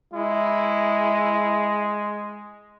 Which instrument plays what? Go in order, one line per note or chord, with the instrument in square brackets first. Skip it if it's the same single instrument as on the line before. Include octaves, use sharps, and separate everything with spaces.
[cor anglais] G#3 [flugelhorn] E4